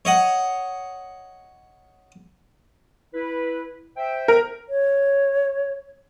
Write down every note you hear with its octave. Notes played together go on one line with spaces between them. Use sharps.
C#5 D#5 F#5
E4 B4
C5 E5 G5
A#4
C#5